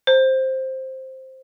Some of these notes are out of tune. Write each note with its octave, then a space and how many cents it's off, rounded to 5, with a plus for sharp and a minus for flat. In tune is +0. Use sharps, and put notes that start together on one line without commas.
C5 +5